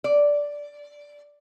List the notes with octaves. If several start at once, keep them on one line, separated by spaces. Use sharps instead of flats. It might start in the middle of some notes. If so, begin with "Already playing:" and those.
D5